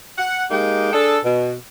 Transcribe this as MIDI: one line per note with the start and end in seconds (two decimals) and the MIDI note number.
0.18 0.45 78
0.51 0.91 56
0.51 0.91 58
0.51 0.91 63
0.51 0.91 67
0.51 0.91 79
0.93 1.19 62
0.93 1.19 68
0.93 1.19 69
1.24 1.54 47